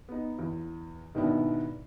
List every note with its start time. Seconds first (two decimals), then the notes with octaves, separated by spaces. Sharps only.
0.09 B3 D#4
0.39 E2
1.14 G#2 B2 D#3 B3 D4 E4